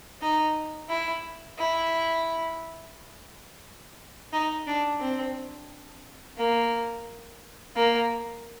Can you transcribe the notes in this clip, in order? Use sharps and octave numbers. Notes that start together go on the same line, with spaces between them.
D#4
E4
E4
D#4
D4
C4
A#3
A#3